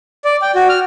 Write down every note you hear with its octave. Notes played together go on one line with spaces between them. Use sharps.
D5
G5
F#4
F6